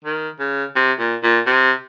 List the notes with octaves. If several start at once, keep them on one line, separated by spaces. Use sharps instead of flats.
D#3
C#3
C3
A#2
A#2
C3